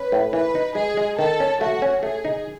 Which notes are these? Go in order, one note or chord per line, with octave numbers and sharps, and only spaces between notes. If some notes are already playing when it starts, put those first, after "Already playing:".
Already playing: C#4 B4
A2
E3 B4
D#4
G#3 G#4
G#3
D#3 A4
C#4
A3 F#4
C#4
A3 G#4
D#4